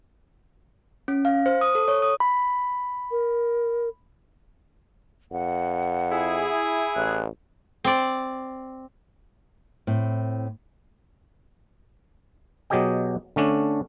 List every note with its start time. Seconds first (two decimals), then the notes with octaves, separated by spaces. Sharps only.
1.08 C#4
1.25 F5
1.46 C5
1.61 D#6
1.75 A4
1.88 C#5
2.02 D#6
2.20 B5
3.11 A#4
5.32 F2 F#5
6.12 E4 G#4
6.96 A1 F#6
7.84 C4 D5
9.87 A2 C4
12.70 B2 F#3 G4 G#4 D#5 G5
13.36 D3 A3 C#4 D4